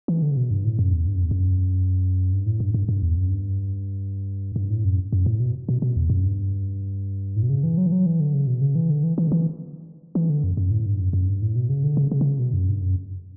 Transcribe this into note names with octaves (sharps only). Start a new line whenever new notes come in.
E3
D3
C#3
B2
G2
A2
F#2
E2
G2
F#2
E2
F#2
G2
A2
G2
G2
G2
E2
F#2
G2
G2
A2
F#2
F#2
A2
B2
B2
B2
E2
F#2
G2
A2
B2
C#3
E3
F#3
E3
F#3
E3
D3
C#3
B2
C#3
E3
D3
E3
E3
D3
E3
E3
D3
F#2
F#2
A2
G2
F#2
F#2
G2
A2
B2
C#3
D3
C#3
C#3
D3
C#3
B2
F#2
G2
F#2